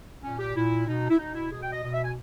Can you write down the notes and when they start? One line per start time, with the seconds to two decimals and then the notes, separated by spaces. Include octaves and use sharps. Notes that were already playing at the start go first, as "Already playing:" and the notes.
0.22 A#2 C#4
0.39 G4
0.55 A#2 E4
0.87 B2 D#4
1.10 E4
1.19 B2 D#4
1.35 E4
1.51 B2 G#4
1.62 G5
1.73 D#5
1.83 B2 D#5
1.94 E5
2.05 G#5